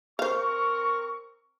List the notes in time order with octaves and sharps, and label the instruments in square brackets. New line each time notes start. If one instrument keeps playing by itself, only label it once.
[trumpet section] C4 A#4 C#6 [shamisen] C5 F5